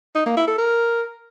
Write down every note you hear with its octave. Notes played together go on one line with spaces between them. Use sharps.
D#4
A#3
E4
A4
A#4